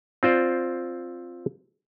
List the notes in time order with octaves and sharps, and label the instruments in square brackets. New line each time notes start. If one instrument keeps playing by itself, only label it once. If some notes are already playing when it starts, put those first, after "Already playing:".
[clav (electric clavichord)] C4 F4 C5 D5